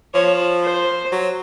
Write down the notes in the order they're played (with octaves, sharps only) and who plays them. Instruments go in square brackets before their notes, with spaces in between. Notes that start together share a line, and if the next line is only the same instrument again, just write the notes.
[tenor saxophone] F3 [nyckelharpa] C#5
[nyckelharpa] C5
[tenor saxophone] F#3